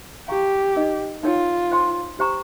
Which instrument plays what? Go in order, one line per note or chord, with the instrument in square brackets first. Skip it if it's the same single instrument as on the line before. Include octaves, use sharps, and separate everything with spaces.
[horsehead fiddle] G4 [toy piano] A#4 F5 A#5 C#6
[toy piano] D#4 A#4 D#5
[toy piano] D#4 A#4 C#5 G5 [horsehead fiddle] F4
[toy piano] C5 G5 C6
G4 C5 G5 A#5 C#6